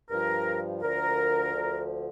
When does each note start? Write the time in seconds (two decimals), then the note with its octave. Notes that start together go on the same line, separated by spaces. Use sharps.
0.09 G2 F3 A#4
0.81 D2 D3 F3 A#4
1.53 D2 D3 F3